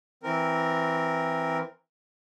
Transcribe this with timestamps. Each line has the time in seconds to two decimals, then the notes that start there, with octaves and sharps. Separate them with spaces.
0.23 E3 C4 A#4